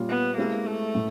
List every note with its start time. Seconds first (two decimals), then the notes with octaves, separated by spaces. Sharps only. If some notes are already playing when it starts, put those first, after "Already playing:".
Already playing: A#2 G3 A#3 C#4 F4
0.09 B3
0.38 G#3 A#3 C4 E4 G4
0.67 A3
0.95 A2